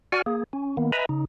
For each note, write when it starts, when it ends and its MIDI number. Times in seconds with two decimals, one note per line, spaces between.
0.12 0.22 66
0.12 0.22 74
0.12 0.22 78
0.12 0.22 80
0.12 0.22 89
0.26 0.44 58
0.26 0.44 68
0.53 0.76 61
0.77 0.91 51
0.77 0.91 58
0.77 0.91 59
0.92 1.06 71
0.92 1.06 75
0.92 1.06 76
0.92 1.06 80
0.92 1.06 82
0.92 1.06 83
1.09 1.25 49
1.09 1.25 63